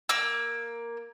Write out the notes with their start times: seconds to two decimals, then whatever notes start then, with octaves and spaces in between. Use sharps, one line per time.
0.09 A#3 E6